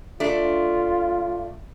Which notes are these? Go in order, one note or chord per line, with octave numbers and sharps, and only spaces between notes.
A3 D4 F4